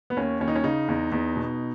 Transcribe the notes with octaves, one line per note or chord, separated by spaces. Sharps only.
B3
D#2 C#4
D#2 C#4
D#4
C#4
C#3 D#4
E2
E2
B2